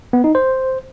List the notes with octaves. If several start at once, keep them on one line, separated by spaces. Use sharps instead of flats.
B3
D#4
C5